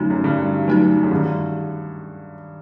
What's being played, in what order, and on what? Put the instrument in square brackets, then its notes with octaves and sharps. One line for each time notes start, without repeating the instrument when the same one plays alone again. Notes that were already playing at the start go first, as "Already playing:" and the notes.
Already playing: [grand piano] F#2 [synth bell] D3 F#3 A3 D#4 F#4
[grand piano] F#2
[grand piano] G2 [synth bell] D3
[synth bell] F#3 A3 D#4 F#4
[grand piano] F#2
[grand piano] G2 [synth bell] D#3